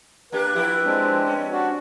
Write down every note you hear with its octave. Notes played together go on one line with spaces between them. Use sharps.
A#3 D4 G4 B4
F3 E4 G4
G#3 C4 D4
C#4
D4 F#4